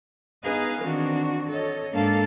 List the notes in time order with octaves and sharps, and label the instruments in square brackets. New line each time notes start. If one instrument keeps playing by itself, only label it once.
[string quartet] B3 D#4 G#4 B4 D#5 F5
D#3 E3 C4 D4 F#4
A4 C#5 D#5
G#2 A#3 D4 A4 F5 A5